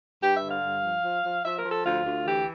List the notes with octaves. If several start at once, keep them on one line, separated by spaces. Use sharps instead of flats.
G2 G4
E5
D3
F5
G2
F3
F3
F3
F3 E5
A#4
F3
A4
D2 F4
D2
E3 G4